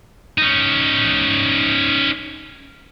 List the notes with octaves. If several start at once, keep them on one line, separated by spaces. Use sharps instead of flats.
C#4 D#4